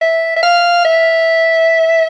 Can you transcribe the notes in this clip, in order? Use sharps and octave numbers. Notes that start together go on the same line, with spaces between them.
E5
E5
F5
E5